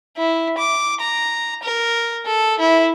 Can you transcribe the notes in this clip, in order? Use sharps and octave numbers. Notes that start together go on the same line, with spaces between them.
E4
D6
A#5
A#4
A4
E4